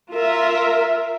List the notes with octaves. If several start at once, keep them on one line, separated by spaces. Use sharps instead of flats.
F4 A#4 E5